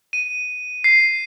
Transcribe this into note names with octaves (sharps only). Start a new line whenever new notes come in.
D#7
C7